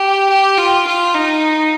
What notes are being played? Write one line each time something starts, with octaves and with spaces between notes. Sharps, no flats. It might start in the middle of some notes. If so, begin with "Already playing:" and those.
Already playing: G4
G4
F4
F4
D#4